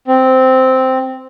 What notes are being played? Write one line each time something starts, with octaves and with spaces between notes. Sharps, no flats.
C4